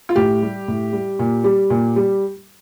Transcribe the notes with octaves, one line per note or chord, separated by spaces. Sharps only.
F4
A2 G4
G3
A2
G3
A#2
G3
A#2
G3